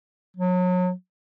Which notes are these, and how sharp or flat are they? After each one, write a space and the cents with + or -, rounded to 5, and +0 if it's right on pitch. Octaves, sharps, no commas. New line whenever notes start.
F#3 -30